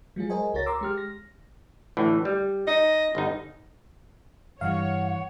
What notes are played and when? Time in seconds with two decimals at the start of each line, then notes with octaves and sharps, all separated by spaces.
0.16 F#3 G#3 F4 G#4
0.30 G#4 A#4 C5 D#5 G#5
0.54 C#2 F#4 A#4 C#5 A6 A#6
0.66 A#5 C6 D6 E6
0.81 G#3 G4 F6
0.98 A#6
1.97 D2 A2 E3
2.25 G3
2.67 D#4 D#5
3.15 G1 D#4
4.61 G2 E3 G3 C#5 F5 F#5